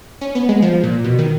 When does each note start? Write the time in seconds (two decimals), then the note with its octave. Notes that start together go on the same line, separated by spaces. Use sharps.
0.21 C#4
0.35 B3
0.49 G#3
0.62 F3
0.83 A#2
1.04 B2
1.19 D#3